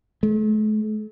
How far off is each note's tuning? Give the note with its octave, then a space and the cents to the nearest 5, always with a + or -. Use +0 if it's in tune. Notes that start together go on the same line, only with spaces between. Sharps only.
A3 -45